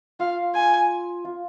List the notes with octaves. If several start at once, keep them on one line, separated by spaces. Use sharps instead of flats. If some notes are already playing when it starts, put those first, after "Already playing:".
F4 F5
G#5
F4